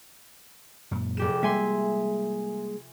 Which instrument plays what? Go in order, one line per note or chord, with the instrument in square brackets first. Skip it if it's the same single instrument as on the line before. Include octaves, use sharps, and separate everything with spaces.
[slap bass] F#2 A#2
[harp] F1 G4 E7 [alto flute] G#4
[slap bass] G3 G#3 A#3 [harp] E5 G#5 C6